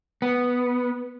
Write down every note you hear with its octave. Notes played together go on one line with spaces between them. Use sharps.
B3